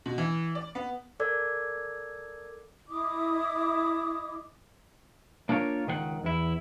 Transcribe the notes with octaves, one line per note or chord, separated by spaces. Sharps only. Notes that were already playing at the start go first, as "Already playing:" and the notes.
B2
E3
D5
B3
A4 A#4 D5 D6 E6 G#6
E4 D#5 D6 D#6
A#3 D4 F4 A#4 C#5
C#2 D#3 A#4 F#5
E2 E4